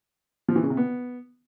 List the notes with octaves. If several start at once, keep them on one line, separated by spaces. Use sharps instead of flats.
F3
E3
C#3
C3
B3